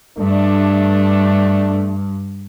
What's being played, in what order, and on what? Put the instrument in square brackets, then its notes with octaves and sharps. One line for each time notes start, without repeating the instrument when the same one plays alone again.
[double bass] G2 [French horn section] A3 D4